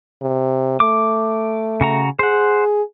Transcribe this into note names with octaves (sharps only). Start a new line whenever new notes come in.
C3
A3 D6
C#3 F#4 A#5
G#4 C5 F#5